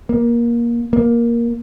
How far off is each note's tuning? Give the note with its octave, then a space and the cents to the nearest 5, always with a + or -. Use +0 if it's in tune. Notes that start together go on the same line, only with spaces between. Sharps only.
A#3 +20
A#3 +10